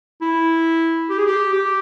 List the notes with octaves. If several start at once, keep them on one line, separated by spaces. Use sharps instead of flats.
E4
G4
G#4
G4
G4